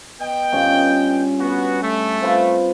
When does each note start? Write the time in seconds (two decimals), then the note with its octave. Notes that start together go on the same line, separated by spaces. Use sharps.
0.21 B3 D#5 G5
0.52 G2 C#4 F4
1.40 B3 F#4
1.83 A3
2.21 C4 F4 B4